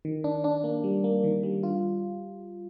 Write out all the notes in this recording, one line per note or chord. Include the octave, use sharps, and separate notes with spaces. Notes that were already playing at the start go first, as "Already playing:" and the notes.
D#3
D4
D4
A#3
G3
A#3
D#3
G3
F4